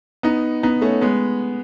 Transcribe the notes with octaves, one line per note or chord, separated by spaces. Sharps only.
B3 D#4
B3 D#4
A3 C#4
G#3 B3